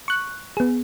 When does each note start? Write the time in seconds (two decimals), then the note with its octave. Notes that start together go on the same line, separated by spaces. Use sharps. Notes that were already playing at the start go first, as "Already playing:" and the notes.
0.08 C#6 F#6
0.57 B3 G#4